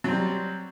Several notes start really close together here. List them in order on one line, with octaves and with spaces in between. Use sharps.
F#3 C4 G3